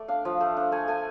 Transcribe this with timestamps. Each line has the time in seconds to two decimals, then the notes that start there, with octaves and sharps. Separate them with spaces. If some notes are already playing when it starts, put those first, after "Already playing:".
Already playing: A3 D5
0.08 D4 F5
0.25 F3
0.41 A3
0.57 D4
0.72 A3 G#5
0.88 A3 G#5